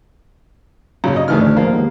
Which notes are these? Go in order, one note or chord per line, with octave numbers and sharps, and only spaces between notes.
F#2 A#2 C#3
D#5
D2 D#3 E3 A3 G#4 F6
A1 D4
D#2 F3 A#3 F5
D#2 G#3 B3